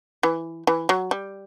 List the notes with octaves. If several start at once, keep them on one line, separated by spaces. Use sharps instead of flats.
E3
E3
F#3
G3